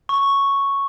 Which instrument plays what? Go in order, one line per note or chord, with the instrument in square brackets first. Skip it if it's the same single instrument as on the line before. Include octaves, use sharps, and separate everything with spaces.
[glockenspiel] C#6